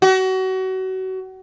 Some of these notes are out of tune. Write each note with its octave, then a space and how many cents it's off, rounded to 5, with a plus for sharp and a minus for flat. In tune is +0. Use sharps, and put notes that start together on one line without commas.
F#4 +30